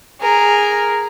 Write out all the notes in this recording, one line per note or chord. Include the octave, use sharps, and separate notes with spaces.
G#4 A#4